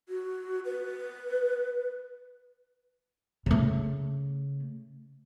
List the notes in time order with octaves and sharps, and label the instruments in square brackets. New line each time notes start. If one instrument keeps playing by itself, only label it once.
[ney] F#4
B4
[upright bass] C#3 A3